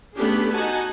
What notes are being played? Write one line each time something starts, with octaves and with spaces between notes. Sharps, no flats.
A3 B3 C#4 D4 G4 G#4
D#4 F#4 F#5 G#5 A5